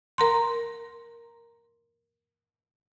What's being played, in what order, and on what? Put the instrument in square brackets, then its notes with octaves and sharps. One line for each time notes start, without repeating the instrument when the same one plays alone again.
[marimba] A#4 A#5 C6